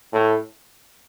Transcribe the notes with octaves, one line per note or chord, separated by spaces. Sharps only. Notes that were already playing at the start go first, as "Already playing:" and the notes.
A2